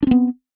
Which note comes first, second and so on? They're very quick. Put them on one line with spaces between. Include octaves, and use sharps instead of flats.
D4 C4 B3